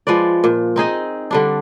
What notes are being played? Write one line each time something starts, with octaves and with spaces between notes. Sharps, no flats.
F3 G#3 B4 D5
A#2
C4 D#4 G#4 D#5
D3 G3 D4